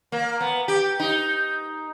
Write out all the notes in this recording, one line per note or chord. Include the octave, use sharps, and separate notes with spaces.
A#3
B3
G4
D#4